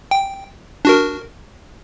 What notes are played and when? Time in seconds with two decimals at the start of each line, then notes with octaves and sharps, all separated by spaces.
0.11 G5
0.85 D4 F#4 A#4